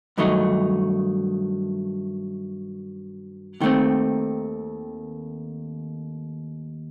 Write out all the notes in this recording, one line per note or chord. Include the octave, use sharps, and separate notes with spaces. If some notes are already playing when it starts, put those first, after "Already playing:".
G2 D#3 F#3 A3 D#4
D#2 D#3 A3 C4